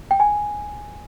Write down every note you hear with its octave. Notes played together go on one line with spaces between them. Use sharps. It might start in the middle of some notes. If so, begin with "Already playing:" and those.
G5
G#5